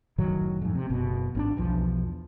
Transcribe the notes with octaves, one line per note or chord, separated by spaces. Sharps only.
F#1 A2 D#3 F#3
F2 G#2
C3
F#1 B2
G#1 C4 D4
B1 E2 F3